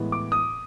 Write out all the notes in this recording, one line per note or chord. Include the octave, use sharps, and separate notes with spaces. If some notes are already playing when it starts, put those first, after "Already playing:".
Already playing: A2 E3 G#3 B3
D6
D#6